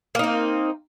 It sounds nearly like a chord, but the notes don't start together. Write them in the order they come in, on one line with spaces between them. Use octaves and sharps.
A#3 D#4 C4